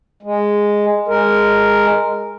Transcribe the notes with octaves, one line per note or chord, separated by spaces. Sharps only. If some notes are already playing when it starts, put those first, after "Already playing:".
G#3
G#3 A#4